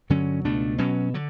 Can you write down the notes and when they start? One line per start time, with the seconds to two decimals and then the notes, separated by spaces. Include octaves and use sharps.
0.10 G2 D3 F#3 C#4
0.44 C#2 B2 A3 D4
0.78 B2 F#3 C#4
1.14 D3 F#3